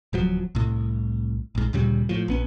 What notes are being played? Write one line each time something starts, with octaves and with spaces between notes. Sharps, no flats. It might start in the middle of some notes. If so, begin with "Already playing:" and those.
D1 F3 F#3
C2 A2
A#1 G#2
D2 A#2 C#3 G3
A2 F3
A#1 B3 C#4